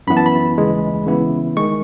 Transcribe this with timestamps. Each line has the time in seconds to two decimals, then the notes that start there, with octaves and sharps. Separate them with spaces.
0.07 F#2 E3 B3 E4 B5
0.17 A5
0.26 B5
0.57 D#2 C#3 E3 G#3
1.07 C#3 E3 B3 E4
1.57 D#3 G#3 C#6